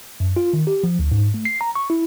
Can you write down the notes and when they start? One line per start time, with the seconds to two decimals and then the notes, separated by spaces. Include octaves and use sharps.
0.20 F#2
0.36 F4
0.53 D#3
0.67 G4
0.83 F3
0.99 D2
1.11 G#2
1.34 A3
1.45 C7
1.61 A#5
1.75 C#6
1.90 E4